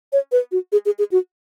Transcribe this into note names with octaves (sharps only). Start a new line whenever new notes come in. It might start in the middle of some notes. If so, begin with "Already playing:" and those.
C#5
B4
F#4
G#4
G#4
G#4
F#4